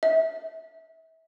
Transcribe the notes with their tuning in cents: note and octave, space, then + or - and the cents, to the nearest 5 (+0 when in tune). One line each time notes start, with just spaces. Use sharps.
E5 -30